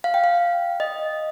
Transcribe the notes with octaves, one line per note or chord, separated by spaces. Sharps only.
F5
G5
F5
D#5